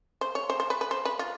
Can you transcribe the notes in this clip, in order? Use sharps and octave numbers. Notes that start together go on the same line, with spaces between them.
C5
C#5
C5
C5
B4
B4
C5
B4
F4